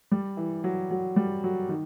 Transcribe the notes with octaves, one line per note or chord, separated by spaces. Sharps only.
G3
E3
F#3
F#3
G3
F#3
D#3